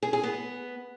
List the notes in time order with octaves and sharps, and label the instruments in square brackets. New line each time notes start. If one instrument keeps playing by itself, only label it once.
[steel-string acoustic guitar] G#4
G#4
B3